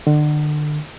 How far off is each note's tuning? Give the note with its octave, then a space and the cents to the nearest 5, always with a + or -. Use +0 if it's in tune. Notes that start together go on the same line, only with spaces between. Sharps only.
D3 +35